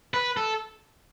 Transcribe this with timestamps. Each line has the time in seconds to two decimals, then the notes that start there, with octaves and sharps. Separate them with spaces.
0.14 B4
0.37 A4